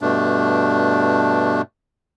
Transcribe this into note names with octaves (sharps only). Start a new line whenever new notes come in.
G2 B2 A3 D4